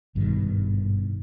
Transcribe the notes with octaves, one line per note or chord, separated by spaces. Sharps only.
G#1 G2 B2 D#3